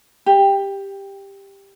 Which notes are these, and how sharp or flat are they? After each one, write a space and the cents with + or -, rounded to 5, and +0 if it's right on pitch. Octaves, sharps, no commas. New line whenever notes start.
G4 +10